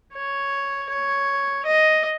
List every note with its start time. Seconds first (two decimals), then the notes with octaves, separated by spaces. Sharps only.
0.14 C#5
0.89 C#5
1.65 D#5